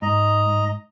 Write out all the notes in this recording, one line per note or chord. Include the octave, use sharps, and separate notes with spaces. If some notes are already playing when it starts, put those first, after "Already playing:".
G#2 D#5 A#5